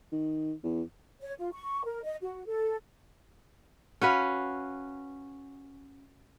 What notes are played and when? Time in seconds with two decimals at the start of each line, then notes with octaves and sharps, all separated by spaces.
0.12 D#3
0.64 E2
1.21 C#5
1.39 F4
1.52 C#6
1.85 A#4
2.03 D#5
2.22 F#4
2.46 A4
4.01 C#4 F#4 B4 F5